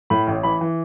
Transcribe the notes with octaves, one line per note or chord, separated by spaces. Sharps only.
A2 B5
A1
E3 B5
E3